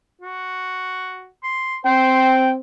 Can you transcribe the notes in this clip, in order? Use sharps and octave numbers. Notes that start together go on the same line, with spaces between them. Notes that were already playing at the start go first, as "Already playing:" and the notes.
F#4
C6
C4 C5 G5